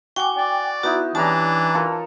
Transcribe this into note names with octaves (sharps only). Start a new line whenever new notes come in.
F#4 G5 G#5 D6
D5
B3 D#4 E4 F#4
E3 G3 C#4 D4 A5 A#5
F4 A4 A#4